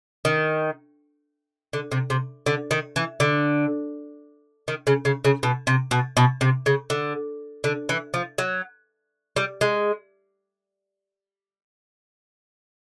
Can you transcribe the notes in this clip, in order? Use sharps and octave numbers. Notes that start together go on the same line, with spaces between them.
D#3
D3
C3
C3
D3
D#3
E3
D3
D#3
C#3
C#3
C#3
B2
C3
B2
B2
C3
C#3
D3
D3
E3
F3
F#3
G3
G#3